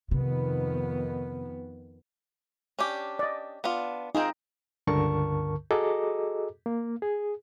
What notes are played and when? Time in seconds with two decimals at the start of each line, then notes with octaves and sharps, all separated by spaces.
0.11 F2 C3 D#3 B3
2.79 C#4 D4 G4
3.19 D5 D#5
3.64 B3 D4 F4
4.15 C4 D#4 F4 G#4 G5
4.87 C#2 G2 D3 A#4 A5 C#6
5.71 F#4 G#4 A4 D#5 A#5 D6
6.66 A#3
7.02 G#4